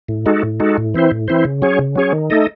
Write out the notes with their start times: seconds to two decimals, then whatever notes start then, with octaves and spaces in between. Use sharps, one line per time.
0.08 A2
0.26 G#3 D#4 F#4 A4
0.43 A2
0.60 G#3 D#4 F#4 A4
0.78 A2
0.94 E3 C4 E4 C5
1.11 A2
1.28 E3 C4 E4 C5
1.45 C#3
1.62 F#3 C#4 G#4 C#5
1.79 C#3
1.95 F#3 C#4 G#4 C#5
2.13 D#3
2.30 A3 D#4 A4 D#5